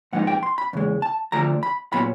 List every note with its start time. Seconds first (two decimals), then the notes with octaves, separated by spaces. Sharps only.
0.13 G#2 F3 G#3 B3 D#4 F#5
0.27 G5
0.43 C6
0.58 B5
0.73 E2 C#3 G#3
1.02 A5
1.32 D2 D3 F3 A3 D4 A#5
1.63 B5
1.92 A#2 F#3 B3 B5